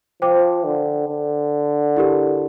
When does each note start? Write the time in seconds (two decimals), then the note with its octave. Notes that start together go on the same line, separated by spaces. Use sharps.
0.22 F3 C5 G5 D6
0.65 D3
1.09 D3
1.97 E4 G4 A#4